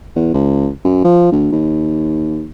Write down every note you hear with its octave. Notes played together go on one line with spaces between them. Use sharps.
E2
C#2
F#2
F3
D2
D#2